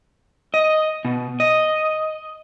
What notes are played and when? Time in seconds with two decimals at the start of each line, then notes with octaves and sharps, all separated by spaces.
0.54 D#5
1.05 B2
1.40 D#5